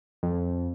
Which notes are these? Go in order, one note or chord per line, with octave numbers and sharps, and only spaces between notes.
F2